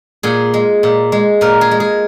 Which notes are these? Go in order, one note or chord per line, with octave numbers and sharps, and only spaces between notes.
A#2 G#4
G#3
A#2
G#3
A#2 A#4
G#4
G#3
G#4